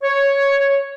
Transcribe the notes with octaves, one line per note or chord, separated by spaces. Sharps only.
C#5